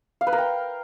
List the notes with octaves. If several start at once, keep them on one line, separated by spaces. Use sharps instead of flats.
F5
B4
A#4
G5